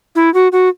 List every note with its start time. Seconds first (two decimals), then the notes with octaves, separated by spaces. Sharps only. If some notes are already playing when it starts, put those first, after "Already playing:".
0.15 E4
0.34 F#4
0.52 F#4